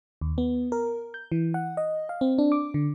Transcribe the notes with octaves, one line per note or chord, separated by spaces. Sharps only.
D#2
B3
A#4
G6
E3
F#5
D#5
F5
C4
D4
D6
D3